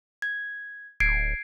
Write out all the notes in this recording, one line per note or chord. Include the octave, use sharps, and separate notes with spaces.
G#6
D1 G#6 C7 D7